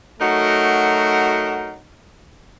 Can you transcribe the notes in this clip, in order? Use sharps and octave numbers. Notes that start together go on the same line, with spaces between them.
F#3 A3 D#4 F#4 A#4